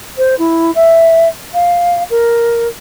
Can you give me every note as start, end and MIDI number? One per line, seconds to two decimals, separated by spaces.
0.17 0.35 72
0.38 0.71 64
0.75 1.28 76
1.54 2.03 77
2.10 2.67 70